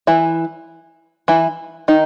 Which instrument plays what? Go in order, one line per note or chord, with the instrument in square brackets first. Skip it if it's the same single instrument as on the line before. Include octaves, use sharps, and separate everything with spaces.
[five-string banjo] E3 E4
E3 E4
D#3 D#4